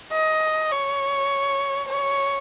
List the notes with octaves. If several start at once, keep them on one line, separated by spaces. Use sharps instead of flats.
D#5
C#5
C#5